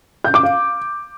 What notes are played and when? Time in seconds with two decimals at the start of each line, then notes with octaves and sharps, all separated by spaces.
0.24 G6
0.34 D6
0.43 F5